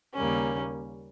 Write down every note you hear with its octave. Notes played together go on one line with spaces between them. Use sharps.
D#2 C#3 G3 A#3 C#4